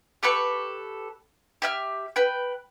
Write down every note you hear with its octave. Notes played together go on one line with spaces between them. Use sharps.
G4 A4 B4 C#6
G4 E5 F6
B4 G5